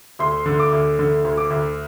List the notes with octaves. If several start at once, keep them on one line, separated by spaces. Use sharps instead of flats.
D2 C6
D3
D6
D2
D3
D2
D6
D2